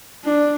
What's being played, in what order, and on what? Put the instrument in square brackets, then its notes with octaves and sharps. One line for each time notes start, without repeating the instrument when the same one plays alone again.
[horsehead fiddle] D4